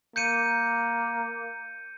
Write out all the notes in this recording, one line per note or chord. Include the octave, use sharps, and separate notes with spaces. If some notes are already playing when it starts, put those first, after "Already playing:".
A#3 G6 C#7 D#7